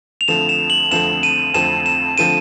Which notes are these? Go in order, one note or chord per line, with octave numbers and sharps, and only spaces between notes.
F7
F2 D3 F3 A3 C4 E7
E7
F#7
F2 D3 F3 A3 C4 E7
D#7
F2 D3 F3 A3 C4 E7
E7
D3 F3 A3 C4 D#7